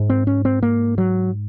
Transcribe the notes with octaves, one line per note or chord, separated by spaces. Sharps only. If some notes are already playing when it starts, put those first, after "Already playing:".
Already playing: G#2
C4
C#4
C4
A#3
F#3